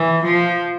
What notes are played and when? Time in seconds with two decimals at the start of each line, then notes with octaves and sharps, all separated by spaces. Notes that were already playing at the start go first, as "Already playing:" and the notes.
Already playing: E3
0.24 F3